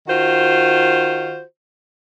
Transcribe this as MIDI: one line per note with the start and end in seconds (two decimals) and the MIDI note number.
0.08 1.42 51
0.08 1.42 65
0.08 1.42 66
0.08 1.42 72